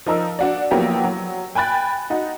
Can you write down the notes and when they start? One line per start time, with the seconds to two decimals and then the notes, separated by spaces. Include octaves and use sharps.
0.06 F3 D#4 A#4 E6
0.39 D4 F#4 D5
0.71 F3 F#3 A#3 B3 E4 G4
1.04 F#3
1.55 G5 G#5 B5 F#6 A6
2.10 D#4 F#4